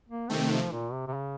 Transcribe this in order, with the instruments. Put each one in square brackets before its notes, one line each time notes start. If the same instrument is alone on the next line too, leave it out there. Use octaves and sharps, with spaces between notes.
[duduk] A#3
[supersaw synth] C3 D#3 A3 [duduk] C4
[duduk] F3
A#2
C3
C3
C#3